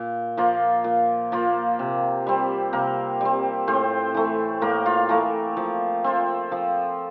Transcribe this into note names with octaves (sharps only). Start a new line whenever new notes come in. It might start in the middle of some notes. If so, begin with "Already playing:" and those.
Already playing: A#2
F3 A#3 F4
A#2
F3 A#3 F4
C3
G3 C4
C3 A#3 A#4
G3 C4
A2 C4 C5
E3 A3
A2 A#3 A#4
F4 F5
E3 A3 A#3 A#4
F3
C4 F4
F3